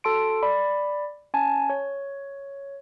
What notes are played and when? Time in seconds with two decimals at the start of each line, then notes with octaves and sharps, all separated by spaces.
0.04 F#4 A4 A5 C6 D7
0.42 D5 B5
1.34 C#4 G#5 A5
1.70 C#5